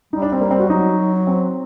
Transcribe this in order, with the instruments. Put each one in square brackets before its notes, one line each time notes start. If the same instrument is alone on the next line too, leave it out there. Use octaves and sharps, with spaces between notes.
[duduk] G3 [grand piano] D#4
[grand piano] D4
C4
A#3
C4
F#4
[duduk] F#3 [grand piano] D#4
[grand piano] C4